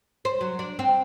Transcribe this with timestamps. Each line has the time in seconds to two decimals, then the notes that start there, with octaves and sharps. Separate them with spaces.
0.25 C5
0.41 F#3
0.59 D4
0.79 C4